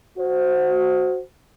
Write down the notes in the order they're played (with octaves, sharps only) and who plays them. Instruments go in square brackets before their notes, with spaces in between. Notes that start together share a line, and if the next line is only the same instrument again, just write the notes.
[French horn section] F#4 C5